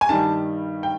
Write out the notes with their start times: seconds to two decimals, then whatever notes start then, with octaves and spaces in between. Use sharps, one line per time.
0.01 G#5
0.09 G2 D#3 G3 A5
0.83 G5